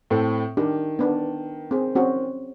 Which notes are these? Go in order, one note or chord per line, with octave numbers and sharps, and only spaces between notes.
A2 C4 A4
D#3 D4 G4
B3 D4
C4 G#4
C4 C#4 F#4